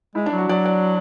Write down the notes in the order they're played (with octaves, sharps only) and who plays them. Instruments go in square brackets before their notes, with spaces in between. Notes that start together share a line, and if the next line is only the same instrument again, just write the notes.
[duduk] G#3 [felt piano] E4
[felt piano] D4
[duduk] F#3
[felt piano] F#4
[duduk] F#3 [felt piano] D5
[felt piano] D5